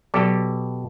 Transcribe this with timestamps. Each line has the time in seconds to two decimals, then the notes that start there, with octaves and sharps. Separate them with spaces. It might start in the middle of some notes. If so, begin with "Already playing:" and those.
0.14 B2 F#3 G4 A4